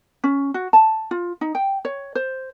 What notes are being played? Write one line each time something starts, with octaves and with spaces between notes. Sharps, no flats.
C#4
F#4
A5
F4
D#4
G5
C#5
C5